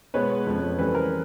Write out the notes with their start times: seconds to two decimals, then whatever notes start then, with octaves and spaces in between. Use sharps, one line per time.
0.14 B2 G#3 B3 B4 C#5
0.47 F2 C#3 F3
0.78 C#3 E3 G3 A4 B4
0.95 A#4 C5